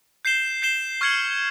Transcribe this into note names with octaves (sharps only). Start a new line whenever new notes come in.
G6 C7 E7 G7
G6 C7 E7 G7
C#6 F6 G#6 C#7 F#7